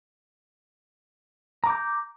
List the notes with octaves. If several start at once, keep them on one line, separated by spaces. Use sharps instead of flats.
A#5 D6 G6